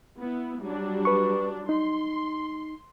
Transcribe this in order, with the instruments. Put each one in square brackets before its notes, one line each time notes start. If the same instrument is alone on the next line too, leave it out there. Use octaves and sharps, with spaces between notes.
[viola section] B3 E4
F#3 G3 D4
[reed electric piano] B4 C#6
[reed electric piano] D#4 [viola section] C6